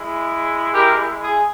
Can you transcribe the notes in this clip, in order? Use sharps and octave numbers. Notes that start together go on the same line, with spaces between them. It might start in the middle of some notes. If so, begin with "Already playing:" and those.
Already playing: G#3 E4
G4 A#4
G#4